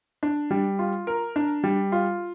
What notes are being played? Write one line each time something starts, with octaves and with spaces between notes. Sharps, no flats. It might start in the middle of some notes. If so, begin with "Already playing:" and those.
D4
G3
F4
A#4
D4
G3
F4